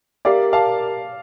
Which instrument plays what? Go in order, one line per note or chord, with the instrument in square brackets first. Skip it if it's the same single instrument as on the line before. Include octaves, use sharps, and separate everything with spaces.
[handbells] G4 A#4 E5 [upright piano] D5 F5
[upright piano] F5 A5